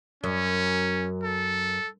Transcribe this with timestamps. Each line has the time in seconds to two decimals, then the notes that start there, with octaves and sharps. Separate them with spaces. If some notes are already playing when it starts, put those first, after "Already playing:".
0.24 F#2 C#4
1.24 A4